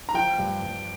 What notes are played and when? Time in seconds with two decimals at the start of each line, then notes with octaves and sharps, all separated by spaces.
0.09 A#5
0.14 F3 G5
0.38 G2
0.62 G2